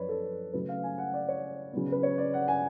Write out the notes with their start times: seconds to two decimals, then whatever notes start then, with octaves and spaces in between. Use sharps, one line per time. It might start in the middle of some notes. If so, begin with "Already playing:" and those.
Already playing: F#2 F3 B4 C#5 D5
0.09 A4
0.53 C#3 F#3 A3 B4
0.69 F5
0.83 G#5
0.98 F#5
1.14 D5
1.28 C#5
1.73 C#3 F#3 B3
1.92 B4
2.03 C#5
2.18 D5
2.34 F#5
2.48 G#5